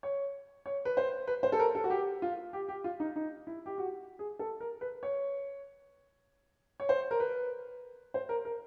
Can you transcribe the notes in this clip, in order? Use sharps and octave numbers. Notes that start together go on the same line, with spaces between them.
C#5
C#5
B4
C5
B4
C5
A4
A#4
A4
F#4
G4
F4
G4
G4
F4
D#4
D#4
E4
G4
F#4
G#4
A4
A#4
B4
C#5
C#5
C5
A#4
B4
C5
A#4
A#4